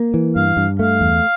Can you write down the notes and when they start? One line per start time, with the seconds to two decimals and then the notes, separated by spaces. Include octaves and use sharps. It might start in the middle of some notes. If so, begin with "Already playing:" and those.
Already playing: A#3
0.14 E3
0.36 G2 F5
0.57 G2
0.79 A3 F5
1.01 E2